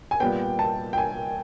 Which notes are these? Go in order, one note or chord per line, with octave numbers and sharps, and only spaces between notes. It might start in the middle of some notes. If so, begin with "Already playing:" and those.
G#5
A#2 G3 B3 G5
A5
G5
G#5